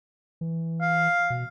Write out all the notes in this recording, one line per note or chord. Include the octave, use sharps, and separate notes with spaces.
E3
F5
B2